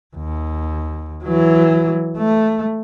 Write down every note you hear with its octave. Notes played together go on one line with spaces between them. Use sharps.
D#2
E3 F#3
A3